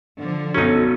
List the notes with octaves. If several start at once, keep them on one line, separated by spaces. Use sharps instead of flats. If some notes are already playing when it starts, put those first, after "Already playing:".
D3 F3
B1 F#3 C#4 D#4 A4